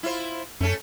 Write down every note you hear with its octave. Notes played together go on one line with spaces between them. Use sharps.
E4 F4 C5
F#2 A3 C#4 A4